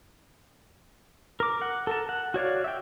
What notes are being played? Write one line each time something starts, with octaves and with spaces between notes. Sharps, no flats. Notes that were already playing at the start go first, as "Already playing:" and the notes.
A#4 D6
F#5
A4 A#4 A5
F#5
F#4 C#5 D5 F5
E5 G5